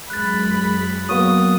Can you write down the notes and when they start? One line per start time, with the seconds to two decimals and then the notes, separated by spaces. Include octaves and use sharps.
0.10 F#2 G#3 B5 F#6 A6
1.09 F#3 A#3 B3 C#6 D#6